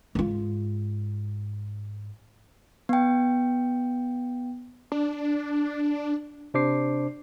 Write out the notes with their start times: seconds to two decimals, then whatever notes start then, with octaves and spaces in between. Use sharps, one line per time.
0.15 G#2 F4
2.89 B3 G5
4.92 D4
6.54 C3 D4 C5 D6 C7